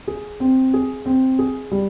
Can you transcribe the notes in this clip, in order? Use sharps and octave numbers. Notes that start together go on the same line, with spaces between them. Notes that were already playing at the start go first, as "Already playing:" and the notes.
G#4
C4
G#4
C4
G#4
G3